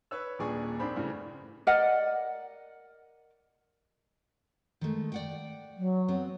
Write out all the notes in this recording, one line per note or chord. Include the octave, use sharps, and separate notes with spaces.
B4 C#5 E6
D#1 A#2 D4 G#4 G#5 C#6
A#1 D#3 C4 D4 C5 B5
G2 C#3 E3 G3 A3
A#4 D5 D#5 F#5
D#3 G#3 A3
D5 F#5 G5
F#3
B3 C4